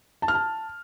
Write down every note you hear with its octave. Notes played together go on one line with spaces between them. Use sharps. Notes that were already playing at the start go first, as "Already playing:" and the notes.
A5
F6
A5